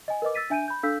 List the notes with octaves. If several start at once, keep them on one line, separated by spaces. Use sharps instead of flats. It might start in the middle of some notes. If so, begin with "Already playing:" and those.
D#5 G#5
A#4 B4 D#5 D6
E6 A6 B6 D#7
D4 E5 G#5 G6 D7 D#7
B5 G6
D4 A4 F5 E6 G6 B6